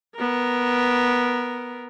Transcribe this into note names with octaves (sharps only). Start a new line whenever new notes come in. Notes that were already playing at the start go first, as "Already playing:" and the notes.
B3 A#4